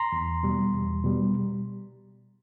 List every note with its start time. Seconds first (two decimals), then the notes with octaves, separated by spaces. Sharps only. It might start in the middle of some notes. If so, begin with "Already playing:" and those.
Already playing: A#5 C6
0.12 E2
0.43 B2 G3
0.73 E2
1.04 B2 G3